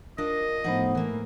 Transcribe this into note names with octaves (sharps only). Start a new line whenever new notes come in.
D4 F4 A#4 D5 D#5
A2 F3 A3 B3 D#4 C5 F#5
E3 A#3 A#4